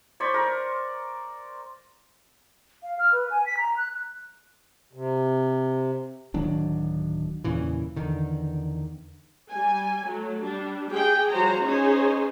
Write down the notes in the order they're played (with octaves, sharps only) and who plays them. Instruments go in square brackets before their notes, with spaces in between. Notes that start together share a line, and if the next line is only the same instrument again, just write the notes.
[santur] C5 D5 B5 C#6
A#4
[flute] F5
F6
B4
G#5
B6
A#5
F#6
[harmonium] C3
[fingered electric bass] D1 D#3 F#3 D4
E2 A#2 C#3 E3
E2 D3 D#3
[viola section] G3 G#5
F#3 A3
G3 D4
G4 G#4 G5
F3 G3 F#4 C5 C#5 A#5
C#4 D#4 G#4 C5 C#5